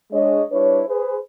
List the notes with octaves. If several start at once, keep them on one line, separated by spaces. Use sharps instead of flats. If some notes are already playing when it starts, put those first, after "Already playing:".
G#3 D4 C#5 D#5
G3 D4 E4 B4 C#5
G#4 B4 C5